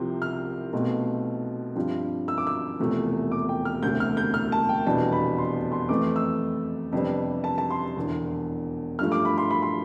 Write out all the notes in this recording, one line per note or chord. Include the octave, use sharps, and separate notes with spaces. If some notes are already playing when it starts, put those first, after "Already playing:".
Already playing: C2 C3 F3 C4
F6
B1 B2 A3 C4
G2 F3 C4
E6
D6
E6
E1 E2 C3 F3 A3
D6
G5
F6
E1 D2 C3 G6
F6
G6
F6
A5
G5
F1 E2 B2 G3 D4 A5
B5
C6
C6
F2 E3 A3 C4 D6
E6
F2 C3 G3 B3 D4
A5
A5
C6
E1 E2 D3
G2 F3 A3 F6
D6
B5
C6
B5
C6